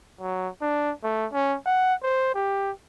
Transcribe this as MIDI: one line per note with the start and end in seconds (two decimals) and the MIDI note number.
0.21 0.48 54
0.61 0.92 62
1.03 1.26 57
1.32 1.56 61
1.66 1.94 78
2.03 2.31 72
2.34 2.71 67